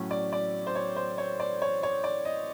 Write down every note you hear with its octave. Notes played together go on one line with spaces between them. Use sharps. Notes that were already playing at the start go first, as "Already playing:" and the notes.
Already playing: A2 F#3 A3 C#4
D5
D5
C5
C#5
C5
C#5
D5
C#5
C#5
D5
D#5